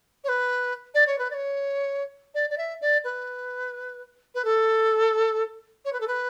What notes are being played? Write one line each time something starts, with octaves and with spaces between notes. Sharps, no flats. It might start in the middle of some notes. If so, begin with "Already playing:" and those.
C#5
B4
D5
C#5
B4
D5
C#5
D5
D5
E5
D5
B4
B4
A4
C#5
B4
A4
B4